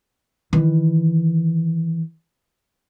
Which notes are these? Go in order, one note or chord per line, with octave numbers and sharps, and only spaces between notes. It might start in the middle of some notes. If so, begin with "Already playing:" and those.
D#3 E3